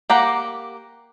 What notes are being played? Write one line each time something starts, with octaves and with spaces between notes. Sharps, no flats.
A#3 G4 F#5 A#5